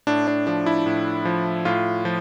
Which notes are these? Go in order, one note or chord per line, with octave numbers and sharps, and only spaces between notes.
A2 D4
D4
F3 D4
E4
A2
F3
A2 F4
F3